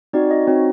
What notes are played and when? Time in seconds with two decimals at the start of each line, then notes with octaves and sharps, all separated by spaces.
0.13 C4 D#4 F#4 D5
0.31 D#5
0.47 C4 D#4 F#4 C#5